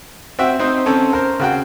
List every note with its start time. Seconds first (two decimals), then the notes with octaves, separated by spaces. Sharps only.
0.39 C4 F#4 E5 G5
0.60 C4 D#4 C5
0.86 C4 C#4 A4
1.13 A#4 C5
1.40 C#3 F#4 G5